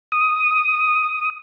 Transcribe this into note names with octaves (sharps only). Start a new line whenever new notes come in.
D#6